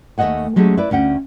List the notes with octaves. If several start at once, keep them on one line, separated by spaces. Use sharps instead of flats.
D#2 A3 C#5 D#5 F#5 G#5
F#3 G#3 A3 C#4 G4
E4 B4 D5
D2 C#4 F#5 G5